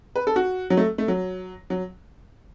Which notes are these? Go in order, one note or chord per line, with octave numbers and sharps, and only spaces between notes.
B4
A4
F#4
F#3
A3
A3
F#3
F#3